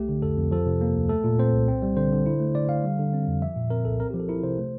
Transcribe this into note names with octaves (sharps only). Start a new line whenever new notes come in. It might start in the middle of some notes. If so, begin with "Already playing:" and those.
Already playing: C2 A3 G4
D3
F2 A4
F2
F3 A4
C3
A#3
D2
A3 A4
A#2
C4 C5
C2
C4
G3
D3 C5
D3
E4
A3
D3 D5
D3 F5
G3
D3
C4
F2
F3 E5
A#2
C4 A#4
C2 A4
C4 A#4
G4
F3
A4
E4 A#4
C3 C5
A3